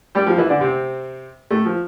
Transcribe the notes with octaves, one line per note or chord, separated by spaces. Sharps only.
G3 G4
F3 F4
E3 E4
D3 D4
C3 C4
A2 A3
F3